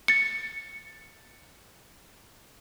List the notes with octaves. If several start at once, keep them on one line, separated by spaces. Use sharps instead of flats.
A6 C#7